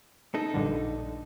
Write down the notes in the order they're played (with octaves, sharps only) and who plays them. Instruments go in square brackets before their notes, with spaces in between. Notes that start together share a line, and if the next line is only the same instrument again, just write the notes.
[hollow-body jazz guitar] D#4 A4
[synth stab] A#1 G2 D3